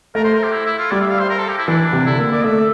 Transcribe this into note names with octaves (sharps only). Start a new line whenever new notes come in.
A3 A#4
C5
A#4
G4
E4
E4
F4
G3 D5
E5
F5
C5
A#4
A4
G4
E4
E3 D4
C3
D3 E4
A#3
A#3 D5
A3 E5